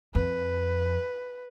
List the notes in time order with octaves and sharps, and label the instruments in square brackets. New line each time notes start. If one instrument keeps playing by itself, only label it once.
[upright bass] F2 [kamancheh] B4